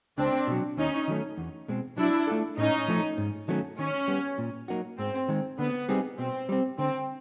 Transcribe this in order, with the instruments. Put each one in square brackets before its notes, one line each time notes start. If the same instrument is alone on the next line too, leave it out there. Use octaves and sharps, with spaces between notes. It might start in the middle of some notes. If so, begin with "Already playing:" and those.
[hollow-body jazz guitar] C#2 [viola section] C4 D4
[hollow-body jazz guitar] B2 F#3
[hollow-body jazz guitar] D#2 [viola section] C#4 D#4
[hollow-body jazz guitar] D#3 F#3 A3 C#4
E2
B2 G#3 C4
[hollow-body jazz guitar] F#3 [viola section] D4 E4
[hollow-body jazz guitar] A3 D4 F4 A4
[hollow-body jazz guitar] A2 [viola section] C#4 D#4
[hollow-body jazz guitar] F3 A3
G#2
D#3 F#3 A3 C#4
[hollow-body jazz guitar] D#3 [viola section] C#4
[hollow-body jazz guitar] G3 B3
A#2
F#3 A#3 D#4 F#4
[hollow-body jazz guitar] G#2 [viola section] C4
[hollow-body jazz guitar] D#3 G#3
[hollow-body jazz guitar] D3 [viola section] B3
[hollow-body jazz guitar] G3 C4 D#4 G#4
[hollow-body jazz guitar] B2 [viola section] C4
[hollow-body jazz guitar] G3 C4
[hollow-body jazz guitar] D3 [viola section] C4